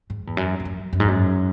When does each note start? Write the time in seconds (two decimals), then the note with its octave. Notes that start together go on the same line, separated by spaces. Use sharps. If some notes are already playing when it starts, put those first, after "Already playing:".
0.10 G#2
0.27 E2
0.37 F#2
0.60 G#2
0.65 F#2
0.93 F#2
1.00 G#2
1.08 F#2